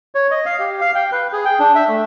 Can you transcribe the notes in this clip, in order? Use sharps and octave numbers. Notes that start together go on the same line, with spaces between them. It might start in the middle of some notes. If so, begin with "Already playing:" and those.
C#5
D#5
F5
G4
F5
G5
B4
G#4
G5
D4
E5
A3